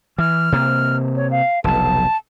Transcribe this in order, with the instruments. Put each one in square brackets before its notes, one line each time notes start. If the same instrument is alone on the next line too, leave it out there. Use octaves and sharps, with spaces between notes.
[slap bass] E3 [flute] F6
[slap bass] C3 A#3
[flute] C#5
F5
[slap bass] F1 B1 [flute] A5